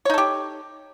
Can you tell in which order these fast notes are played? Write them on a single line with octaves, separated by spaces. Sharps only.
C#5 D#4 A4 G4